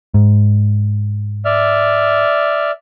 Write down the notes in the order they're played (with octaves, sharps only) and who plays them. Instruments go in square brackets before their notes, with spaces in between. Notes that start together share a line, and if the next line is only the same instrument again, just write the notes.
[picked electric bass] G#2
[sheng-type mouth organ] D5 E5 F6